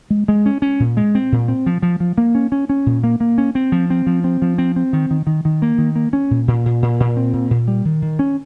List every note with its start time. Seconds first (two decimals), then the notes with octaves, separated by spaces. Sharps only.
0.10 G#3
0.28 G#3
0.46 C#4
0.62 C#4
0.80 A#2
0.97 G#3
1.15 C4
1.32 A#2
1.48 C4
1.66 F3
1.82 F3
2.00 F3
2.18 A#3
2.35 C#4
2.52 C#4
2.69 C#4
2.86 A#2
3.04 A#3
3.20 A#3
3.38 C#4
3.55 C4
3.72 F3
3.90 C4
4.07 F3
4.24 C4
4.42 F3
4.58 C4
4.76 C4
4.93 D#3
5.11 D#3
5.27 D#3
5.45 D#3
5.62 A#3
5.78 D#3
5.96 A#3
6.13 C#4
6.31 A#2
6.48 A#2
6.66 A#2
6.82 A#2
7.00 A#2
7.17 C4
7.33 A#2
7.50 A#2
7.68 G3
7.85 D#3
8.02 D#3
8.19 C#4